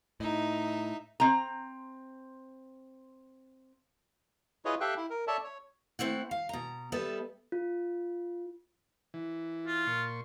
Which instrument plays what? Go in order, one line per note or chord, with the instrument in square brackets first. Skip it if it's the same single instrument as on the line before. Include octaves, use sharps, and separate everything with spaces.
[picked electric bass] A2 [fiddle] D#4 E5
[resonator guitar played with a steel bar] C4 A#5
[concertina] E4 F4 G#4 B4 C#5 D#5
G4 A4 E5 F5 G5 F#6
E4
A#4
A4 C#5 D5 E5 A5
C#5
[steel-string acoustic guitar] A3 C4 E4 F#5
F5
B2 A#5
G3 B3 A4 E5
[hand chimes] F4
[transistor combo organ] E3
[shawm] F4
[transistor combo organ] A#2 C6 C#6